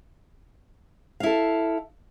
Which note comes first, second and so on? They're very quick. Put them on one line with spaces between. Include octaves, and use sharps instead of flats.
F5 E4 A4